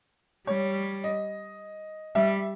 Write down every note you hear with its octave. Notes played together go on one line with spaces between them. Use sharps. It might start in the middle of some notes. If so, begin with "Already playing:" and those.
G3 C#5
D#5
G3 E5